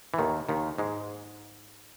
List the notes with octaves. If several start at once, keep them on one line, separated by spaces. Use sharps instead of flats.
E3
D#2 D#3
D#2 D#3
G#2 G#3